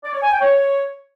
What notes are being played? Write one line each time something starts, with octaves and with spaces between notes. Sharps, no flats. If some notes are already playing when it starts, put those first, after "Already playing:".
D5
C#5
G#5
G5
C#5